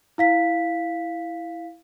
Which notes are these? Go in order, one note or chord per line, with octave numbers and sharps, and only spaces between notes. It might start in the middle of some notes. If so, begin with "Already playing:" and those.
E4 F5 B6